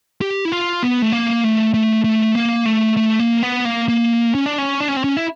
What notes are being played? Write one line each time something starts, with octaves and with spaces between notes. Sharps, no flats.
G4
E4
F4
B3
A3
A#3
A3
A3
A3
A#3
A3
A3
A#3
B3
A#3
A#3
C#4
D4
C#4
D4
C#4
C4
C#4
E4